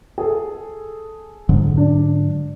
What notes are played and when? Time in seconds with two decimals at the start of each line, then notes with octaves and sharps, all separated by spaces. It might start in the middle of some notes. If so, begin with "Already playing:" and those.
0.18 G#4 A4
1.49 G#2 D3 F#3
1.77 D4